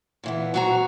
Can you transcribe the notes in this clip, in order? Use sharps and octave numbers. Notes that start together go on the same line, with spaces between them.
A#2 E3 B3
F#3 C4 F#4 D#5 A#5